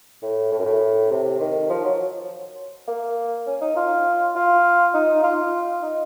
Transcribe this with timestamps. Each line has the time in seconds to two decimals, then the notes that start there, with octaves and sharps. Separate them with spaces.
0.22 A2
0.52 A2
0.59 F#2
0.65 A2
1.10 C3
1.40 D#3
1.70 F3
1.84 F#3
2.88 A#3
3.46 C#4
3.61 D#4
3.76 F4
4.35 F4
4.94 D#4
5.23 F4
5.83 D#4